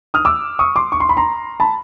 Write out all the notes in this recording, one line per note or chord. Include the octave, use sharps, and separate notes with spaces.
D#6 F6
D6 E6
C#6 D#6
C6 D6
C#6
C6
B5
A#5 C6
A5 B5